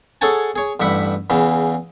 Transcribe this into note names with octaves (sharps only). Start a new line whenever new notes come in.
G#4 A4 C#5 F#5 G#5 A5
G#4 C#5
A1 G2 E5 F#5 B5
E2 C#3 E3